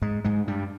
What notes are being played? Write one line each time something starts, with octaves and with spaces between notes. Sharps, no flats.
G#2 G#3
G#2 G#3
G2 G3